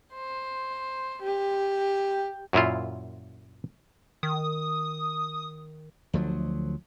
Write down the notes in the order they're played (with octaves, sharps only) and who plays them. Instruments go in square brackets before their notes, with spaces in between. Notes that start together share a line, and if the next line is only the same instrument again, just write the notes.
[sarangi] C5
G4
[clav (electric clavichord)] F#2 A#2 E4 F4
[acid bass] D#3 [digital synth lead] D#6
[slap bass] D2 F3 F#3